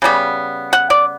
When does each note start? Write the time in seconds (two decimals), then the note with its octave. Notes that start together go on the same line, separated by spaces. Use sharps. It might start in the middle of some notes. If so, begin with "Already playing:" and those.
0.02 C#3 G3 B3
0.73 F#5
0.90 D5